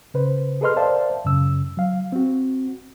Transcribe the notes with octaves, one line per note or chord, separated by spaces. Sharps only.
C#3 B4 C5
G#4 A4 B4 D#5 C6 F6
A#4 C5 D5 E5 F5 A5
F#2 C#3 E6
F#3 F5
C4 F#4